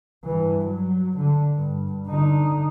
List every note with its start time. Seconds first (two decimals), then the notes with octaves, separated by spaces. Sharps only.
0.24 G2 E3
0.66 F#3
1.18 D3
1.56 G2
2.07 D3 D#4